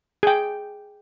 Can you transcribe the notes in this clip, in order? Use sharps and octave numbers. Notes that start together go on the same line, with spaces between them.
G#4 G5